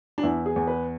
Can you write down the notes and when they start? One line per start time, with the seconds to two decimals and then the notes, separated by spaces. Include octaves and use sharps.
0.18 D4
0.23 E2 E4
0.46 G#4
0.56 E2
0.67 B4